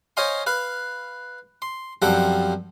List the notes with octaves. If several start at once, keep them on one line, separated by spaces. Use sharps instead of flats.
C5 C#5 D#5 F5 G#5 C6
B4 F5
C6
F#2 F3 G3 C4 A4 F#5